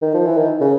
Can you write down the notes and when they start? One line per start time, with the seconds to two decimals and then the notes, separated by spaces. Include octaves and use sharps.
0.02 D#3
0.14 F3
0.26 E3
0.37 D#3
0.61 C#3